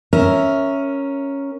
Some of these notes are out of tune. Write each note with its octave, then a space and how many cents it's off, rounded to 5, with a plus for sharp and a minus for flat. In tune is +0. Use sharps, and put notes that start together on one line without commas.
C#4 +0 A#4 +0 E5 +0